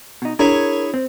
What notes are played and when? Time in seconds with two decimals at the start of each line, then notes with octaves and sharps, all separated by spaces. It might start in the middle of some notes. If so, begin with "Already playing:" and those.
0.22 B2 D#4
0.39 D4 E4 G#4 A#4 C#5
0.94 C4